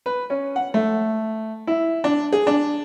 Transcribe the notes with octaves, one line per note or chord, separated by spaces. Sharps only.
B4
C#4
F#5
A3
E4
D4
G#4
D4